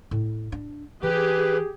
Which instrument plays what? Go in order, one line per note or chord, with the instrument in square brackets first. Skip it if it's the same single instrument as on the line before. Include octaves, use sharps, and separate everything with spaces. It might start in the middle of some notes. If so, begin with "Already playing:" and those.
[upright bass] A2
D4
[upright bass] E3 [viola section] G4 G#4 [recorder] B4